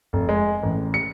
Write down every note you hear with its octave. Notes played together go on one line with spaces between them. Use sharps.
F1
G#3
A1
C#7